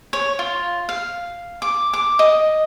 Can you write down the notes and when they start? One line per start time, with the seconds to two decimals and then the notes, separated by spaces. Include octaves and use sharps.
0.13 C#5
0.39 F4
0.89 F5
1.62 D6
1.93 D6
2.19 D#5